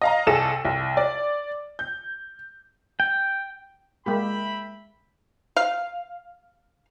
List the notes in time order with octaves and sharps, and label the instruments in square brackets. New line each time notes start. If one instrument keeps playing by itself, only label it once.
[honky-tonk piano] D#5 F5 A#5
C2 G#4 A4 E7
C2
D5
G6
[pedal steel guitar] G5
[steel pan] G#3 A#3 G4 [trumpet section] E5 G5 B5
[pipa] F5